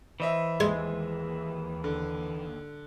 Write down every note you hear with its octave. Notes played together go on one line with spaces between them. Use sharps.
E3 C5 D#5 E5
D#2 G#3
D3